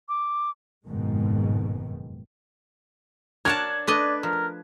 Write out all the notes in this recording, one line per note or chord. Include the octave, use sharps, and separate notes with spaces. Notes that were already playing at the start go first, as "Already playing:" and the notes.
D6
F#1 F2 G#2 B2 D#3 G#3
D4 A#4 C#5 F#5 A5 G#6
A3 D4 B4 D5 D#5
F3 A#4